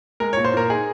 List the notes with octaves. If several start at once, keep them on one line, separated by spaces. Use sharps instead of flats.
G#3 A#4
C#5
A#2
C5
A#2 A#4
D#4 G#4